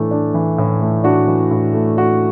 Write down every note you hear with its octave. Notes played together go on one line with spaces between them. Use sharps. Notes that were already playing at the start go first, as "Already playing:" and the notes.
Already playing: A2 E3 A3 D4
D4
E3
A2
A3
D4 F#4
E3
A2
A3
D4 F#4